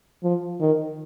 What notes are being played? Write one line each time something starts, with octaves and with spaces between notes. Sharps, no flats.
F3
D#3